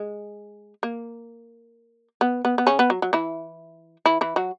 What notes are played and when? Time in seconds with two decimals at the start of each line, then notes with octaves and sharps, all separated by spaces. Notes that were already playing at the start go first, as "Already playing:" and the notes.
Already playing: G#3
0.83 A#3
2.21 B3
2.45 B3
2.58 B3
2.67 C#3 C#4
2.79 B3
2.90 F#3
3.02 F#3
3.13 E3 E4
4.06 E3 E4
4.21 E3 E4
4.36 F#3 F#4